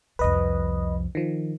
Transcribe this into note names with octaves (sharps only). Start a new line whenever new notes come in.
C2 F2 B4 D#5
D#3 F3